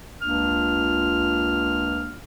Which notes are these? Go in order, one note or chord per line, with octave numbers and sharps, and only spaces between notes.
C#2 A#3 D4 F4 F6